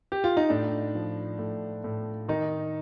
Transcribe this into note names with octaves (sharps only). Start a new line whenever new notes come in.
G4
F4
D#4
A2 D4
F3
A2
A2
D#3 D#4